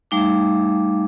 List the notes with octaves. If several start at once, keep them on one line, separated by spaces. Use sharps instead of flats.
G3 A3 D#4 F5 D6